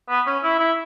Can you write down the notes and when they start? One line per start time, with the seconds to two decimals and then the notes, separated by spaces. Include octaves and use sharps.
0.09 B3
0.26 C#4
0.44 E4
0.59 E4